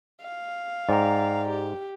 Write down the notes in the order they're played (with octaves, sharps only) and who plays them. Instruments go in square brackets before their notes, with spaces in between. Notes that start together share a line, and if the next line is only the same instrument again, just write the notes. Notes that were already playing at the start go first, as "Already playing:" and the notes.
[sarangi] F5
[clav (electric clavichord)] G#2 [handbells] D5 G5 A#5
[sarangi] G4